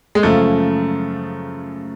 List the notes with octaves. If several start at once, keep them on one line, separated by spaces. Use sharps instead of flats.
G#3
F#2 C#3 F3 A3